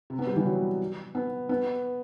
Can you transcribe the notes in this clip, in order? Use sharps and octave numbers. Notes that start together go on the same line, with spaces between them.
C3
B3
G3
E3
F#3
B3
B3